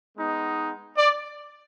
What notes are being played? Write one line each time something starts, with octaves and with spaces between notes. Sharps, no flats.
G#3 B3 D#4
D5